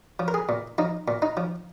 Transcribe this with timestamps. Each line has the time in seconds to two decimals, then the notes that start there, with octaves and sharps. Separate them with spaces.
0.19 F3
0.28 A#4
0.34 G#4
0.49 A#2
0.78 F3 D#4
1.08 A#2
1.22 D#4
1.37 F3